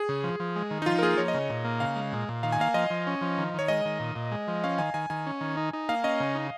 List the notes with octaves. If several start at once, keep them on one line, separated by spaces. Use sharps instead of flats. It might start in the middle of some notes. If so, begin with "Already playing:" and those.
Already playing: G#4
C#3
F3
F3
G#3
D#3
D#4
F3 F4
A#4
A#3 G#4
F3 C#5
D#5
C#3
A#2
A#3
C#3 F5
G#3
A#2
A#2
D#3 F5
G#5
A#3 F5
F3 D#5
F3
C#4
F3
D#3
D#3 C#5
G#3 D#5
D#3
A#2
A#2
G#3
F3
C#4 F5
D#3 G#5
D#3 G#5
D#3 G#5
C#4
D#3
D#4
D#4
A#3 F5
C#4 D#5
C#3
D#4